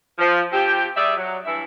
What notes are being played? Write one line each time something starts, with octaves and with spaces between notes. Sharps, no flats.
F3
F3 C4 G4
G3 G#4 D5 E5
F#3
G2 E3 E4 E5